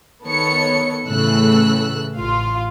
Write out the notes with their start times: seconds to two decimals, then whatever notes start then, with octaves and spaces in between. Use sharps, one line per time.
0.24 D#3 B3 A4 C#5 C#7
1.06 A2 C#3 E3 A3 E6 F#6
2.17 A1 F4 F5